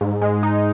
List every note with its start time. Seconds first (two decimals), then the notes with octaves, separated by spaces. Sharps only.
0.01 G#2
0.22 G#3
0.43 D#4